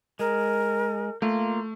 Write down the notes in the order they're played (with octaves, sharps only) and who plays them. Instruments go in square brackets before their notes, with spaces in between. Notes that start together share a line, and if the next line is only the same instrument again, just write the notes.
[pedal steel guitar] G#3 [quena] A#4
[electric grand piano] A3 [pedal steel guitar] A#3 F4